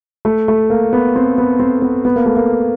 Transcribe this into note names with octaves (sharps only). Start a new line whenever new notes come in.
A3
A3
A#3
B3
C4
B3
C4
B3
B3
A#3
A3
A#3